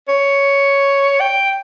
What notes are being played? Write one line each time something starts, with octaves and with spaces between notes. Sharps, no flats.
C#5
G5